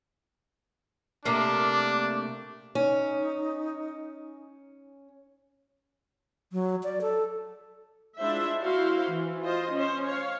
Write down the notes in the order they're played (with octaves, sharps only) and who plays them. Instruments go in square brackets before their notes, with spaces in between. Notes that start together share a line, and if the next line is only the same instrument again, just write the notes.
[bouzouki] C3 A3 A#3 [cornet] D4 [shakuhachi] D6
[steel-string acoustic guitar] C#4 [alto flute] D#4
[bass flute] F#3
D5
A4
[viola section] G#3 D4 E4 F4 C5 E5
E4 F#4 C5 F5
E3
F4 C5 D#5
C#4 C5
C#5 F5